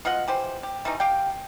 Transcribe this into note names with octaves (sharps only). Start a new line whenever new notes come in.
B2 F4 D#5 F#5
E3 G4 C5
G4
E3 G3 A3 D#4
G4 F5 G5